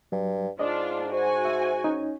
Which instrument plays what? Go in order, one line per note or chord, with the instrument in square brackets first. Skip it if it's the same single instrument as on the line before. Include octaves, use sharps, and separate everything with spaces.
[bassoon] G2 [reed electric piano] F#3
[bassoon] G#2 [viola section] D4 F4 [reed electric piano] D5 D#5
[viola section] F#4 G#5 [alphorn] C5
[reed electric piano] E5
[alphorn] C#4 [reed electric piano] D#4